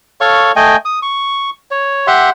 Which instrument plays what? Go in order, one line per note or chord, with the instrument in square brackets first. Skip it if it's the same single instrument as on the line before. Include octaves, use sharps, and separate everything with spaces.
[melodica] A4 C#5 F5 C#6
A3 D#5 G5 G#5
D#6
C#6
C#5
G4 E5 F#5 C6